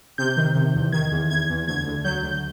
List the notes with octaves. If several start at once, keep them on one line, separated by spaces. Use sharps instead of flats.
C3 G6
D#3
C3
E2
D#3 G#6
E2
E2 G#6
E2
D2 G#6
D2
F#3 G6
D2